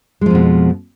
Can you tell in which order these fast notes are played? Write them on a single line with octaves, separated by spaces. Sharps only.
G#3 F3 F2 B2